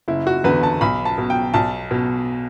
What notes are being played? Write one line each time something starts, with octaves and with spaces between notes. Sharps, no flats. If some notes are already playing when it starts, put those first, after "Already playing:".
F#1 E4
F#4
E2 D3 B4
A5
B1 B5
A5
B2
G5
B1 A5
B2